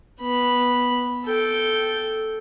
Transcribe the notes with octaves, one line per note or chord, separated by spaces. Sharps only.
B3 B5
A4 G5